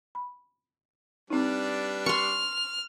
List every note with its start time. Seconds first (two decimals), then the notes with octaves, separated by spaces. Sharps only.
0.15 B5
1.30 G3 C4 D4 D#4 B4
2.06 C6 C#6 F6